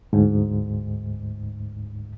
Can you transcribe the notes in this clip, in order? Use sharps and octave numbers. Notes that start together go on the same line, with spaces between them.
D2 G#2